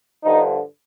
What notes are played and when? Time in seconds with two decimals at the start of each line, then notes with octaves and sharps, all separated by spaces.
0.23 G2 D3 F3 D#4